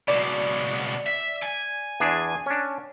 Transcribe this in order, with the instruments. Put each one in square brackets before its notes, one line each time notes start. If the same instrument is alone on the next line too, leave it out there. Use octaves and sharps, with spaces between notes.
[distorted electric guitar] C#2 B2 [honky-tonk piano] D5
[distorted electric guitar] E5
G#5
[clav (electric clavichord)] E2 D4 G#4
C#4 D4